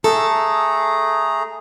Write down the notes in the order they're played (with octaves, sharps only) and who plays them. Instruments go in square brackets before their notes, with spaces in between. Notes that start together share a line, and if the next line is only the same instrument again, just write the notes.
[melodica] A3 G#4 A#5 [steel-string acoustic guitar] A4